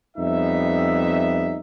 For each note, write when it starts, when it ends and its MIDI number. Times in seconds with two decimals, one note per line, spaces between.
0.17 1.60 41
0.17 1.60 55
0.17 1.60 59
0.17 1.60 63
0.17 1.60 76